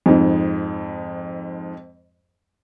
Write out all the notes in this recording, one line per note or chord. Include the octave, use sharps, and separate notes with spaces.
F2 G#2